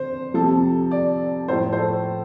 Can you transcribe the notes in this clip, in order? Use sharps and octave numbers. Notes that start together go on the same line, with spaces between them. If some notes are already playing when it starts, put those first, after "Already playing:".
Already playing: F2 D3 C5
F2 C3 F3 A4
D5
A2 F3 C5
C5
A4